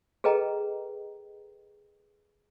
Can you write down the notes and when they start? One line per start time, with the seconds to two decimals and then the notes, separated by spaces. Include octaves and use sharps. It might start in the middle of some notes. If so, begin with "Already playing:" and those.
0.24 G#4 A4 B4 D#5 G5 A#5